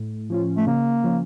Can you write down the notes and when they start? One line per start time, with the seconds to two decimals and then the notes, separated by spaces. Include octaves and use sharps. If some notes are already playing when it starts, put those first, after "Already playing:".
Already playing: A2
0.30 F3 C#4 F4
0.57 A3
0.66 C#3 A#3
1.04 F3 C#4